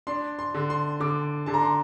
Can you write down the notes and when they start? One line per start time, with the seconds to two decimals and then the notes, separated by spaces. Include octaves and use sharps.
0.07 D4 C6
0.39 C6
0.54 D3
0.70 C6
1.00 D3 D6
1.46 D3 A5
1.54 A#5
1.62 C6